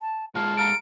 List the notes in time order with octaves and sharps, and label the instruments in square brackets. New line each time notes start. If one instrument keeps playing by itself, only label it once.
[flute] A5
[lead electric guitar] A#2 G#3 [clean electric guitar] F4 [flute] A5
[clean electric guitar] A4 F5 A#5 [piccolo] D7